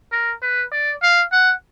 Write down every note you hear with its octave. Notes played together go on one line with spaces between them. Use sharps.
A#4
B4
D5
F5
F#5